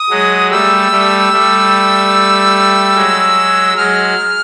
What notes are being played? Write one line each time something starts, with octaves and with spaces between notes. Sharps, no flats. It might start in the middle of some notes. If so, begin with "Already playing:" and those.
Already playing: D#6
F#3 G#3
G3 A3 E6
G3 A3
G3 A3
F#3 G#3
F#3 G#3 F6